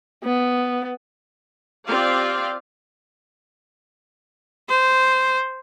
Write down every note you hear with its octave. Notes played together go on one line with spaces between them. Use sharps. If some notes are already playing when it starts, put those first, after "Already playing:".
B3
C4 F4 G4 D5 F5
C5